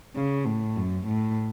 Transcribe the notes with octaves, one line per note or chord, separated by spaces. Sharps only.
C#3
A2
F#2
A2